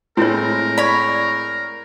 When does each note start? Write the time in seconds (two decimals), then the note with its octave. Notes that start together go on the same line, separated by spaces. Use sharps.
0.17 A2 G#3 C4 E4 A#4 C#5
0.78 C#5 D5 B5